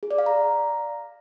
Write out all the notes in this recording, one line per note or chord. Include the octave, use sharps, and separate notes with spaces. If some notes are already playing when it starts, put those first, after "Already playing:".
G#4
D5
F5
A#5